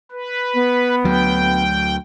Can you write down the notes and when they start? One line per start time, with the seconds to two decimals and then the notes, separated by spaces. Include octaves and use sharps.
0.12 B4
0.54 B3
1.04 D2 F#3 G5